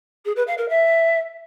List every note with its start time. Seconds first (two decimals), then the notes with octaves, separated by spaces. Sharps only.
0.25 G#4
0.36 B4
0.47 F5
0.58 A#4
0.68 E5